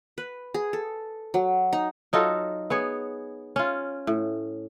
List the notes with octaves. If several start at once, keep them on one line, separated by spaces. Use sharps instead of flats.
B4
G#4
A4
F#3
D#4
F#3 D#4 F4 A4
B3 G#4 C#5
C#4 F4
A2